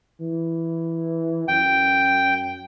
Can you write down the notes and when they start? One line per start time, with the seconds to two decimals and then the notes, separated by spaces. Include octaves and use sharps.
0.20 E3
1.48 F#2 G5